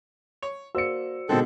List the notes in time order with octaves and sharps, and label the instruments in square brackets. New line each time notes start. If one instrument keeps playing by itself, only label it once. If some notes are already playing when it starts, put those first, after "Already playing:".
[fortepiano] C#5
[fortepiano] A#3 [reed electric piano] F#4 C5 D5 [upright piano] E6 C#7
[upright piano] B2 G#3 [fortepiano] D3 D#3 [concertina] C4 A4